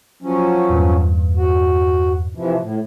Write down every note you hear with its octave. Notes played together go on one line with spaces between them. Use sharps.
F3 F#3 C#4
E2 G2 A#2
F#4
C3 E3 F3
A2